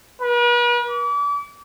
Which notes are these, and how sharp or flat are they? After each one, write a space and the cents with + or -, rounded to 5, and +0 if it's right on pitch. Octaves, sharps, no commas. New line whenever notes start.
B4 -45
D6 -35